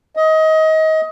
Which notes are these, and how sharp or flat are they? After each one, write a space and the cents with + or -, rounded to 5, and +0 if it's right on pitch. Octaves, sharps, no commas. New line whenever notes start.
D#5 +25